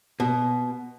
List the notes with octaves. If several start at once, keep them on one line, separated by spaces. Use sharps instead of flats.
B2